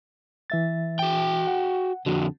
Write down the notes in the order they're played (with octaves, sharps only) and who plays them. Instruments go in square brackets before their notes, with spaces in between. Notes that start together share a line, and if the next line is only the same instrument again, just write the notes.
[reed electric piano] E3 E5 A6
[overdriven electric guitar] F#4 G5
[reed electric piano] F#5
[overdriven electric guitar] F2 D3 [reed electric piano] F#4